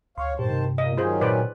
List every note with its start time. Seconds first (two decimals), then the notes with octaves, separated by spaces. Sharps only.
0.18 D2 C#5 F5 C6 C#6
0.39 G2 A#2 D#3 G4 C5 A5
0.51 C3
0.78 A#2 A#3 D#5
0.98 D#3 F#3 C#4 F4 G#4 C5
1.21 A#2 B4 C5 D5